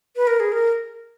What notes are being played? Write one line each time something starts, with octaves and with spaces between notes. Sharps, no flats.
B4
A#4
G#4
A#4